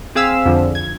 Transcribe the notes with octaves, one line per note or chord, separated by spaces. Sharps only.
C4 G#4 F5 E6 B6
F2 D3 F3
G#6